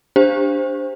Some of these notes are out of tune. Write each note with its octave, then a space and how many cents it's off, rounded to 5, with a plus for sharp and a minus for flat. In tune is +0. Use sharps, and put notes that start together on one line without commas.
D4 +0 G4 +30 C5 +0